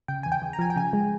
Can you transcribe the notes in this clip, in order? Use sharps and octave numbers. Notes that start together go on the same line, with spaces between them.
C#3 G5
G#5
E2
G5
E2
A#5
F3 G#5
G5
C#3 G#5
G#3